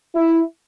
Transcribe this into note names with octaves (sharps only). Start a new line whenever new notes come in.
E4